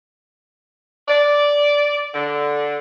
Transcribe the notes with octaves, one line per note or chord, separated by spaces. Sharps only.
D5
D3